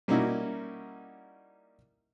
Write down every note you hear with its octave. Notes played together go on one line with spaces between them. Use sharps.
G3 A#3 C#4 D#4 E4 F#4